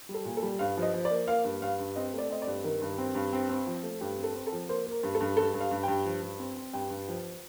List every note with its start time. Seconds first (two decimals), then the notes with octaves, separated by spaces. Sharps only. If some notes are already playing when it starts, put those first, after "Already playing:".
0.09 G3
0.14 A4
0.25 A#2
0.37 A4
0.43 G3
0.59 G2 F5
0.77 F3
0.82 D#5
0.94 F3
1.05 D5
1.11 A#3
1.28 A#3 F5
1.44 G2
1.62 G2 F5
1.79 G2
1.96 C4 D#5
2.14 A3 D5
2.30 C4 D#5
2.42 D5
2.47 G2
2.64 D#3 A#4
2.82 G2
2.98 C4
3.15 G2
3.33 C4
3.49 C4
3.67 F3
3.83 A3
4.01 G2 G4
4.18 C4
4.24 A4
4.35 C4
4.47 A4
4.52 F3
4.69 A#3 C5
4.86 A#3 A#4
5.03 G2
5.15 A4
5.21 G2
5.37 G2 A4
5.54 G2
5.60 F5
5.71 G2
5.83 G2 G5
6.05 F3
6.22 G2
6.39 C4
6.56 C4
6.74 G2 G5
6.90 G2
7.08 F3